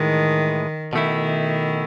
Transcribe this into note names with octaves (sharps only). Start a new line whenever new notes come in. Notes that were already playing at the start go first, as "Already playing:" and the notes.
Already playing: A2 D#3 E3 G#3
B2 D#3 A3 E4